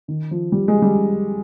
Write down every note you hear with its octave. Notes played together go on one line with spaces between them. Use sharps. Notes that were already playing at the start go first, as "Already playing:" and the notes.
D#3
F3
G3
G#3
G3